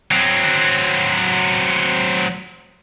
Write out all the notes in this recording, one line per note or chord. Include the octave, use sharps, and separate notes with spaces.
F#3 C4